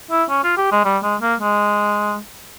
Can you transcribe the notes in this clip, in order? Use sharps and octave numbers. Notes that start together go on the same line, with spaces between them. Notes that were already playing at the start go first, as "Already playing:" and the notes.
E4
C#4
F4
G4
G#3
G3
G#3
A#3
G#3